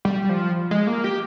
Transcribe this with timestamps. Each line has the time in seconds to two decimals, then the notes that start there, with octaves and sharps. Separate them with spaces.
0.05 G3
0.29 F3
0.71 G#3
0.87 A#3
1.04 G4